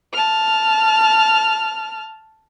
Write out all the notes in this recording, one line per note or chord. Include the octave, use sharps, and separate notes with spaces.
A5 F6